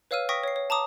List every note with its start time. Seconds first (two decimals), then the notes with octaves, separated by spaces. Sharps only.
0.11 B4 C#5 F5 E6 F6 D#7
0.29 G5 C#6 D#6 A#6 B6
0.44 C#5 C7
0.56 C#5
0.70 A5 A#5 D6 D#6